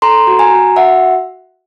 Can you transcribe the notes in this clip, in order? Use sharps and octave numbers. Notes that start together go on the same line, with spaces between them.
A4 A#5 C6
F#4
G#5 A#5
F#4
F#4 E5 F#5